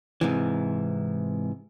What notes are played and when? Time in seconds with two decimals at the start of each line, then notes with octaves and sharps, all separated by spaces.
0.21 G#2 C3 E3